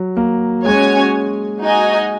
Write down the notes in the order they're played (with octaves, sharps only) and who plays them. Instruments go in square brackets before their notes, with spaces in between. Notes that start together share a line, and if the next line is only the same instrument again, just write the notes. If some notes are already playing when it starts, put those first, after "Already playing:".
Already playing: [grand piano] F#3
A#3
[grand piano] G#3 [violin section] C#4 F#4 C#5 G#5
[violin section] D#4 F#4 D#5 G#5